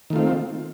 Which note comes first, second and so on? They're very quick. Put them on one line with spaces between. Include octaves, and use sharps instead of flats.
D#3 A3 F4 C4